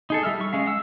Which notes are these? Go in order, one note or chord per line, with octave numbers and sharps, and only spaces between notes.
D#4 G#4 A4
G3 E5 E6 F6
C#6
G#3 C#4 F5
F#5 E6